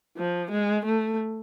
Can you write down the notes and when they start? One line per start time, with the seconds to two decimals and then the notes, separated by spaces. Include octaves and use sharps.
0.17 F3
0.51 G#3
0.85 A3